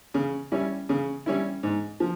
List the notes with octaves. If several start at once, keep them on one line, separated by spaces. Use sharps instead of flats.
C#3
G3 C#4 E4
C#3
G3 C#4 E4
G#2
F3